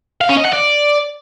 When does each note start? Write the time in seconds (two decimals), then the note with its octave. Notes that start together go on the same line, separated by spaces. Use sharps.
0.21 F5
0.29 C#4
0.37 D#5
0.45 F#5
0.53 D5